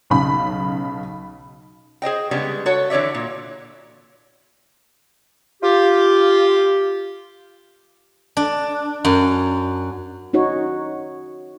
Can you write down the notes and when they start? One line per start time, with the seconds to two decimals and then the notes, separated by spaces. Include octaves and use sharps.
0.10 B1 C#3 B5
2.02 G#4 C5 D#5 G5
2.31 C#3 G3 G#3 B3 D4
2.66 F#4 A4 C#5
2.90 D3 E3 C#5 D5 E5
3.15 A#2
5.63 F4 G4
8.37 D4
9.05 F#2
10.33 C#4 D#4 F#4 C#5